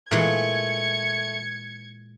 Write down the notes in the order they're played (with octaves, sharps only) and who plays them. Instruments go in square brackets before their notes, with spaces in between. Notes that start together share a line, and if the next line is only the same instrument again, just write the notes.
[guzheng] A#2 E3 G#3 [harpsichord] A3 [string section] G#6 C#7